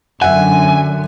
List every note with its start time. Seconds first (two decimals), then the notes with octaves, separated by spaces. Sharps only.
0.22 F#2 D3 E5 F#5 G#5